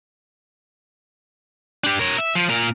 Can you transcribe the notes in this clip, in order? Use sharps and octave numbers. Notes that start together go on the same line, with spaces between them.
D4 G4
A#4 C#5
E5
F3
A#2 A#4